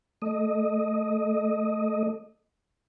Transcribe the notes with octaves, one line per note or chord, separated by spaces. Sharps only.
A3 D#5